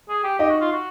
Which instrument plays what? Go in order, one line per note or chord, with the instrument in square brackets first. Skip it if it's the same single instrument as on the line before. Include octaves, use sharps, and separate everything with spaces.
[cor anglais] G#4
G4
[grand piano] D#4 D#5 [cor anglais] G4
[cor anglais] F#4
F4
F#4